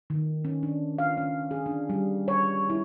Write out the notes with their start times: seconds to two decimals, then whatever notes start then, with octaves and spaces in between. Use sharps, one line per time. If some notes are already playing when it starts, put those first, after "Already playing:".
0.10 D#3
0.45 C#4
0.63 D4
0.99 F5
1.17 C#4
1.51 G#4
1.66 D4
1.89 G3
2.28 C#5
2.70 E4